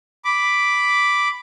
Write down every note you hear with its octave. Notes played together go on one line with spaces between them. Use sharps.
B5 D6